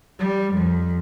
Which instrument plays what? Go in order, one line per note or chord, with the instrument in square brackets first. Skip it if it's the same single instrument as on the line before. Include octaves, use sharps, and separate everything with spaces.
[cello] G3
F2